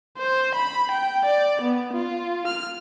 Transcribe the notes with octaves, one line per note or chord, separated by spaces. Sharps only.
C5
B5
G5
D5
B3
F4
F6